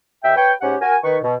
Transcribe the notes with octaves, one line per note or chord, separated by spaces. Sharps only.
D#2 E5 G5
B4 C#5 G5
G#2 C#4 G4 F#5
F#4 A#4 G#5
D#3 B4 C#6
B2